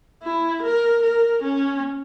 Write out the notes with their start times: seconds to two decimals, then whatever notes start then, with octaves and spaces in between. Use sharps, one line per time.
0.23 E4
0.63 A#4
1.03 A#4
1.43 C#4